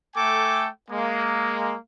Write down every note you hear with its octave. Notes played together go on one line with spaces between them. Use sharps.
A3 A4 G5 G#5 D6
G#3 A#3